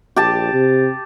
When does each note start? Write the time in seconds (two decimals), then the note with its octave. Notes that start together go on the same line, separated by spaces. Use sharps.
0.16 A#1 G4 A5
0.53 C3